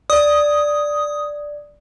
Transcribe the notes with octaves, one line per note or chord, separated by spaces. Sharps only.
D5 D#6